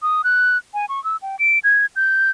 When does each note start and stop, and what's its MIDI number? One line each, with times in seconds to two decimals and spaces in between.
0.02 0.22 87
0.24 0.58 90
0.74 0.86 80
0.89 1.02 85
1.04 1.17 88
1.22 1.36 79
1.39 1.59 98
1.64 1.86 92
1.96 2.31 91